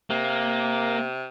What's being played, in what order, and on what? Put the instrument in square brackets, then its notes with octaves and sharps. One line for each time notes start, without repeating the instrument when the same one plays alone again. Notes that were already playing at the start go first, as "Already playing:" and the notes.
[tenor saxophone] C3 [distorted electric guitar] A#3